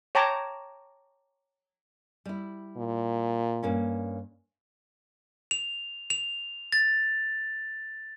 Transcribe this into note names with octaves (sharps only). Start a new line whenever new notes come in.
C#5 G5 A5 A#5 D6
G3 E4
A#2
G2 A#3 C#4
F7
F7
A6